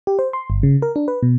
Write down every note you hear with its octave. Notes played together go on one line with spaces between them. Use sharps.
G4
C5
C6
G1
C#3
A#4
D4
B4
B2